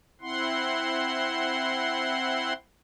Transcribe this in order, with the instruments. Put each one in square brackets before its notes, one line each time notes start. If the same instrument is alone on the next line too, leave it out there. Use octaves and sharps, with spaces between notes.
[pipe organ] C4 E4 F#5 C6